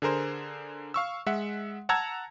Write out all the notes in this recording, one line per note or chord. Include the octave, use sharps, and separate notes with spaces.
D3 G#4 A#4 C5
F5 C#6 E6
G#3 E5 F#5
F#5 A5 A#5 E6 G#6